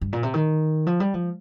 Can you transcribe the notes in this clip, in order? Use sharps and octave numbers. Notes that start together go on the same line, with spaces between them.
G2
A#2
C3
D#3
F3
G3
F3